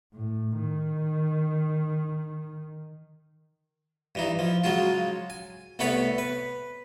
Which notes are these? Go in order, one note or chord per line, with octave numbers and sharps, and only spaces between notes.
A2
D#3
G2 E3 D#4
F3
C#3 F#3 G#3 F4
G#5
C2 A3 B3 B4 C#5 B5
B4